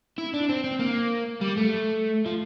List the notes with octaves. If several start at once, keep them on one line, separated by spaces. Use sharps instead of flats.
E4
D4
C4
C4
A#3
G3
A3
F3